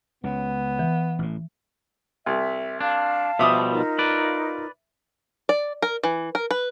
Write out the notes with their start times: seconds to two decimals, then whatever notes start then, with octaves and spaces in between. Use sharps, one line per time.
0.24 C#2 C#3 B3
0.79 E3
1.19 A1 A2
2.26 C2 E5
2.80 D4 F5 A5
3.39 B2 F3 G3 E5 D6 D#6
3.71 D#4 F4 A#4
3.99 B4 D5
5.49 D5
5.82 A#4
6.03 E3
6.35 A#4
6.51 B4